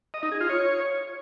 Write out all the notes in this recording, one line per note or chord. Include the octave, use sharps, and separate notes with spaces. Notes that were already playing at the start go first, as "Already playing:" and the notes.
D#5
D#4
G#4
F4
C#5